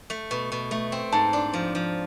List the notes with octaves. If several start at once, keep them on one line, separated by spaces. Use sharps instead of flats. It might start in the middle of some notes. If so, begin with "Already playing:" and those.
A3
B2
B2
A3
C4
G#2 A5
D4
F3
F3